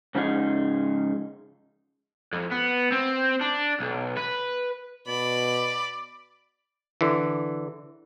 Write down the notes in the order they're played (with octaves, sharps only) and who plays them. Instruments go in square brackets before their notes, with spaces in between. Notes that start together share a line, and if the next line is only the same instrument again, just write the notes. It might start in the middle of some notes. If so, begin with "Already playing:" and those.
[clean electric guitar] G#2 C#3 F3 D#4 E4 G#4
[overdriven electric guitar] F2
B3
C4
D4
B1
B4
[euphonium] B2 [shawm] D5 [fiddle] B5
[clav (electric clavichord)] D3 E3